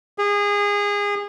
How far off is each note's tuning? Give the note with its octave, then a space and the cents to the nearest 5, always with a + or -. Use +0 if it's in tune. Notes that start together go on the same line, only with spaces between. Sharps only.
G#4 -25